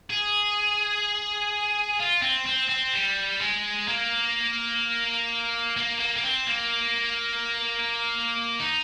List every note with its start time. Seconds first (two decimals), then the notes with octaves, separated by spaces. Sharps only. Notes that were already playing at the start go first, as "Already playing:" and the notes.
0.10 G#4
2.00 F4
2.22 C4
2.47 C4
2.69 C4
2.93 G3
3.41 G#3
3.88 A#3
5.77 A#3
6.00 A#3
6.17 A#3
6.23 C4
6.47 A#3
8.60 D#4